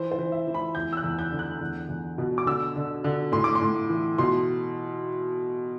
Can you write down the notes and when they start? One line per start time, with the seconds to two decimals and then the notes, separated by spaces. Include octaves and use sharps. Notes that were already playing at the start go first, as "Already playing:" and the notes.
Already playing: E3 C5
0.11 C5
0.19 E3
0.32 E5
0.47 E3
0.54 B5
0.75 E2 G6
0.93 E6
0.97 F#6
1.03 E2
1.19 G6
1.32 D3
1.39 F#6
1.61 E2
1.89 E2
2.18 B2
2.38 D6
2.46 D3 E6
2.76 D3
3.04 D3
3.32 A2 C6
3.44 D6
3.55 C6
3.61 A2
3.89 E3
4.18 B2 C6